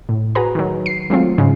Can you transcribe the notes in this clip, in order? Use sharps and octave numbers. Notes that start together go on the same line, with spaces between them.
A2
F#4 G#4 B4 A#5
D#3 F#3
C7
F#3 G#3 A3 C4 F4
G#2 C#3 G#3